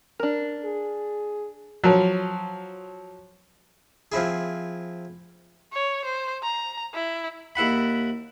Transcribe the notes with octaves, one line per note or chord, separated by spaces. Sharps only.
D4 A#4
G#4
F3 F#3
F3 C4 E4 G#4
C#5
C5
A#5
E4
D#2 E4 F#5 B5